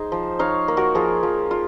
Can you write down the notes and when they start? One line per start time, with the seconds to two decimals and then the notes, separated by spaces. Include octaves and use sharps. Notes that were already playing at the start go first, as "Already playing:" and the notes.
Already playing: D#4 G#4 C5
0.12 F3
0.39 D#4 C#5 F5
0.68 A#3
0.77 F#4 A#4
0.95 F3 F4 G#4
1.23 F3
1.51 F4